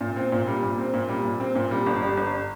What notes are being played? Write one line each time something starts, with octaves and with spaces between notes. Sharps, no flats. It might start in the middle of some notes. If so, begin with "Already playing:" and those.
A#2
C4
A#2
G3
A#2
C4
A#2
G3
A#2
C4
A#2
G3
G1
G3
G1